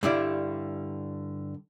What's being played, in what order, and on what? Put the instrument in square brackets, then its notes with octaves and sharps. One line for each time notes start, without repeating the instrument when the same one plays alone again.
[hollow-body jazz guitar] G2 D3 G3 E4 D5